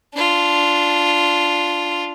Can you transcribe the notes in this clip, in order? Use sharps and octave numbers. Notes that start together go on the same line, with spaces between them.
D4 F4